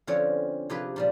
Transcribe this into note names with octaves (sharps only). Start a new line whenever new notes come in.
D3 F3 C4 C#4 C#5
C3 F3 F4 G4 G#4 B4
A#2 F3 G3